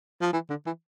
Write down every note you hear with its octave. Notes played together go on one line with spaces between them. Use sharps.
F3
E3
D3
E3